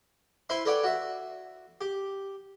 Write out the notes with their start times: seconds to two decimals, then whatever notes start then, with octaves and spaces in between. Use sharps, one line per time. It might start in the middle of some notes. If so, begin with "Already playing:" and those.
0.49 E4 B4 C5 E5 B5 C6
0.65 A4 B4 C#5 D5 F#5 G5
0.83 F#4 E5
1.81 G4